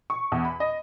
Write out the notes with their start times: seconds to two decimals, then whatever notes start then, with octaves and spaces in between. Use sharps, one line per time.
0.10 C#6
0.32 E2
0.45 B5
0.60 D#5